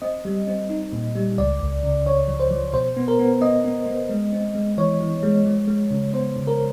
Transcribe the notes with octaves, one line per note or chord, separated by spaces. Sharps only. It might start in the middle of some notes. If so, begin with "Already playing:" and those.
C4 D#5
G3
C4
D#4
A#2
G3
C#2 D5
C#2
C#3
C#3 C#5
F3
C5
F3
B2 C5
B3
A#4
B3
B3 D#5
B3
B3
G#3
C4
G#3
E3 C#5
E3
G#3
F3
G#3
C#3
B3 C5
C#3
A#4